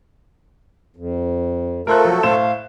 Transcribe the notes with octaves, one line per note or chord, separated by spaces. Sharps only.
F2
A3 F4 A4 A#4 C5 F#6
F3 F#3
A2 C5 F5 E7